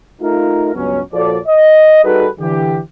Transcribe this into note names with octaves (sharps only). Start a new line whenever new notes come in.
A3 D#4 F4 A#4
C#2 G2 F#3 B3 C#4
A#2 F3 F#4 A4 C#5 D5
D#5
G3 D#4 F#4 G#4 A4 B4
D3 E3 G4